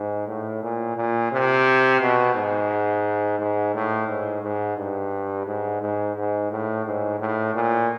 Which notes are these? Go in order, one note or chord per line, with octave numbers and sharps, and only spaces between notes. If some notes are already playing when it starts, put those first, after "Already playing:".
Already playing: G#2
A2
A#2
A#2
C3
B2
G#2
G#2
A2
G#2
G#2
G2
G#2
G#2
G#2
A2
G#2
A2
A#2